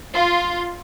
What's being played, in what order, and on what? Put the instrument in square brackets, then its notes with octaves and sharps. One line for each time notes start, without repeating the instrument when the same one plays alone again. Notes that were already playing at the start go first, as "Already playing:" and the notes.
[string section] F4